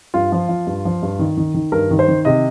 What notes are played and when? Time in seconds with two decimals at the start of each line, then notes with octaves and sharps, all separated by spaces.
0.14 G2 F4
0.32 F3
0.49 F3
0.67 G2
0.85 F3
1.02 G2
1.19 D#3
1.37 D#3
1.54 D#3
1.72 G2 A#4
1.91 D#3
1.99 C5
2.08 D#3
2.25 C3 D#5